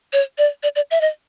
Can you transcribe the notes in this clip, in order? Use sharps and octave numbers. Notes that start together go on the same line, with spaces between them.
C#5
D5
D5
D5
E5
D#5